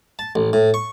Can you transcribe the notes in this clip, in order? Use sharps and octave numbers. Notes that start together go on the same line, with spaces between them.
A5
A1
A2
C#6